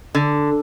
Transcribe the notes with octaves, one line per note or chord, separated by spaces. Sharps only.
D3